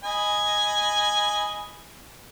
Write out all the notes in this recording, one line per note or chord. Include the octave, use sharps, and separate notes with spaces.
D#5 G#5 B5